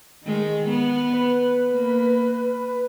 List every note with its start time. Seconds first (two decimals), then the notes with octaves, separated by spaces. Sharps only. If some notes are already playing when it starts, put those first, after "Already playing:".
0.24 D#3 G#3
0.69 B3
1.13 B4
1.71 A#3